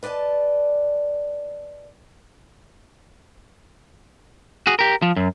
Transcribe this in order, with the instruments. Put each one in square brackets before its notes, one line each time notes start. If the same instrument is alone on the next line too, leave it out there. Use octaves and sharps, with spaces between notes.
[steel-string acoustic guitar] B4 D5 D#5 G#5 A5
[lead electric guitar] F#4 G#4
G4 A#4
F3
F#2